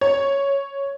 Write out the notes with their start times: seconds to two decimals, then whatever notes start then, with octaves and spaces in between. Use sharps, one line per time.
0.01 C#5